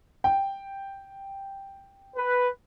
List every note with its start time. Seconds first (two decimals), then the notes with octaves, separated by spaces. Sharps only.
0.24 G5
2.16 B4